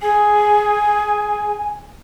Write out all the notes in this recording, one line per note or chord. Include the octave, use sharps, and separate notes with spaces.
G#4 G#5